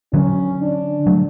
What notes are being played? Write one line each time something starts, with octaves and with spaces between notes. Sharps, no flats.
D3 F#3 C#4
D4
F#3 A3